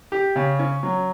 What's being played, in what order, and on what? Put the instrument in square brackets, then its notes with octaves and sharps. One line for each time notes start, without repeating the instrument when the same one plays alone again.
[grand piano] G4
C#3
C#4
F#3